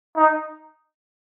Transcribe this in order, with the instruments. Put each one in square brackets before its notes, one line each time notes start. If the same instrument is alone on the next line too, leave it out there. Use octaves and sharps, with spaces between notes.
[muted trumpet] D#4